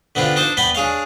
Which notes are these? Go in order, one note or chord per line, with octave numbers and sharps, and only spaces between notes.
D3 B3 C4 D4 F4
D4 D#4 C5 A5 D6
B3 B4 D5 G5
D4 G#4 C#5 F5